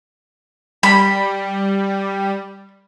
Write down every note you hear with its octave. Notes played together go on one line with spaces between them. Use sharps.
G3 B5